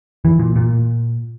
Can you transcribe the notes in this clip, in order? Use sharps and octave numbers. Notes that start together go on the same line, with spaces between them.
E3
A#2
A#2